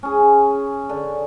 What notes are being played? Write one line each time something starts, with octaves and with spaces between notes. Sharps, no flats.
C#4 G#4
D3